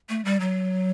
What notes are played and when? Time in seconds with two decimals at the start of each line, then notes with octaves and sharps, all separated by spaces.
0.09 A3
0.25 G3
0.40 F#3